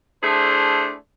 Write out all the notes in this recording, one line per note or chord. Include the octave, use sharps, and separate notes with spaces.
A3 D4 E4 G#4 C5